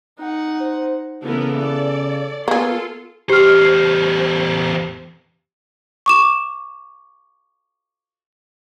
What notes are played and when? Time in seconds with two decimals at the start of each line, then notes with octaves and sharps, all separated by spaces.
0.19 D#4 F#5
0.61 C5
1.24 C#3 E3 B3 A4 A#4
1.60 D5
2.48 A#3 B3 F4 G#4 A4 C6
3.30 E2 G4 C5 F6
6.06 C#6 D6 E7